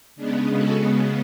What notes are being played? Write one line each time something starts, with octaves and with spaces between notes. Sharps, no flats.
C#3 G#3 B3 D4
F#4 A4